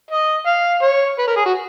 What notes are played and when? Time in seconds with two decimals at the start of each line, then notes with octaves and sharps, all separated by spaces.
0.11 D#5
0.47 F5
0.83 C#5
1.19 B4
1.28 A#4
1.36 G#4
1.46 F#4